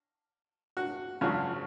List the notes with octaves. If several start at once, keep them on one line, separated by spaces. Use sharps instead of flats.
F#4
G#1 F#2 C#3 F3 F#4